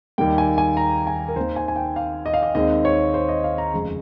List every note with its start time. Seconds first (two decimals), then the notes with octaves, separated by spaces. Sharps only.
0.18 D#2 D#3 G3 A#3 G5
0.38 G#5
0.58 G#5
0.77 A#5
1.07 G#5
1.28 A#4
1.36 D#2 D#3 A#3 C5
1.56 G#5
1.68 G#5
1.76 G5
1.96 F5
2.26 D#5
2.34 F5
2.43 D#5
2.55 D#2 D#3 G#3 C4 D#5
2.85 C#5
3.14 C5
3.29 D#5
3.44 F5
3.58 A#5
3.73 F1 F2 C#3 G#3